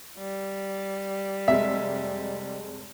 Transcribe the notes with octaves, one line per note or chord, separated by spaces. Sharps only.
G3
F1 G#3 E5